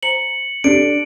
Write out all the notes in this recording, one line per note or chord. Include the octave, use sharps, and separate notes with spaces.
C5 A#5 C#7 F#7
D4 G4 A4 D7